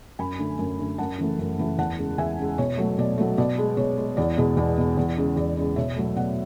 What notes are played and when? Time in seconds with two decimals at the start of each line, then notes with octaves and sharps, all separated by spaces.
0.19 F#2 G#5 B5
0.39 D3 A3
0.59 F#2
0.79 D3 A3
0.98 F#2 F#5 A5
1.18 C#3 E3 A3
1.39 F#2
1.58 C#3 E3 A3
1.78 E2 F#5 A5
1.99 C#3 G#3
2.18 E2 E5 G#5
2.39 C#3 G#3
2.58 B2 C#5
2.78 F#3 A3
2.98 B2 D5
3.18 F#3 A3
3.38 B2 D5
3.58 G#3
3.77 B2 C#5
3.98 G#3
4.17 E2 D5
4.37 B2 G#3
4.57 E2 D5
4.78 B2 G#3
4.97 E2
5.18 C#3 G#3
5.36 E2 D5
5.57 C#3 G#3
5.76 B2 C#5 E5
5.96 F#3 A3
6.16 B2 D5 F#5